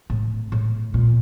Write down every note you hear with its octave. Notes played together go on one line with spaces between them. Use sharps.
A2
A2
A#2